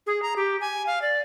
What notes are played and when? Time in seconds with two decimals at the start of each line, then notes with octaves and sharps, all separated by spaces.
0.07 G#4
0.22 A#5
0.36 G4
0.61 G#5
0.87 F5
1.02 D5